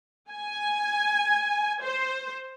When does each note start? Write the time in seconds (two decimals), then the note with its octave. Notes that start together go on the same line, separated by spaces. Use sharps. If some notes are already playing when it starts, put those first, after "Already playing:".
0.30 G#5
1.83 C5